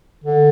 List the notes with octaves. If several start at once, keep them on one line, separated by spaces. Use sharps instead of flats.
D3